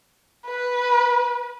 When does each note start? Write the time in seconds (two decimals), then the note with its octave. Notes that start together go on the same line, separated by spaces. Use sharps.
0.46 B4